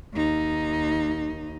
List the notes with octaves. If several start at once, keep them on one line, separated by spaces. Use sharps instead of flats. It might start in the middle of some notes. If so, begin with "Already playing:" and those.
D#2 D#4